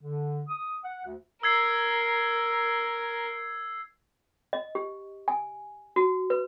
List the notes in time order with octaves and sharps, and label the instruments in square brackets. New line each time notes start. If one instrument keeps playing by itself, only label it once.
[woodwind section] D3
D#6
F#5
D2
[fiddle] A#4 [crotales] E6 G#6 C7
[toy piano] D#5
G4
G#5
F#4
B4